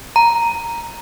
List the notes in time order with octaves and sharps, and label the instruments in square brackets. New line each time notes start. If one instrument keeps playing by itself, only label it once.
[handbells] A#5